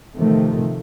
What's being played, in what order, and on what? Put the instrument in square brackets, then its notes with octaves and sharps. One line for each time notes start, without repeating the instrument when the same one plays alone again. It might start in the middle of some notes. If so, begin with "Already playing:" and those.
[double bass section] C3 D#3 F3 A3